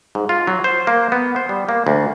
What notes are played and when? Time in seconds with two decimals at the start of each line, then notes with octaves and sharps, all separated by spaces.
0.15 G#2
0.29 F4
0.47 F#3
0.64 C5
0.87 A#3
1.12 B3
1.36 C5
1.49 G3
1.69 A#3
1.87 D2